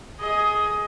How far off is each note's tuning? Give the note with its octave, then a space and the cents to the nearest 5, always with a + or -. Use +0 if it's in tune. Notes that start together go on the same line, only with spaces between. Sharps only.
G#4 +10 D#5 +20